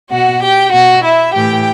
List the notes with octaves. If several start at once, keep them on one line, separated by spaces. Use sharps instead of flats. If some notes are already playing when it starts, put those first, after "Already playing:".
B2 F#4 F#5
G4 G5
B2 F#4 F#5
E4 E5
A2 E3 G4 G5